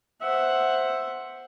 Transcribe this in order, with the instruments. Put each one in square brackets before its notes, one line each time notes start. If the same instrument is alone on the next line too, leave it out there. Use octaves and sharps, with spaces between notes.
[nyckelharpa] C5 F#5 [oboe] E5